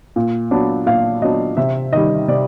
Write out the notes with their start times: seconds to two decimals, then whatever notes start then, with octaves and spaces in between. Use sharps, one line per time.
0.16 A#2
0.51 F#3 B3 D4
0.86 A#2 F5
1.22 F#3 B3 D4 D#5
1.57 C3 E5
1.93 D#3 G3 D#5
2.28 C3 D5